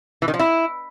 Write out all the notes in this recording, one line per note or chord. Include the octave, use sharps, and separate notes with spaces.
E3
D#3
F3
E4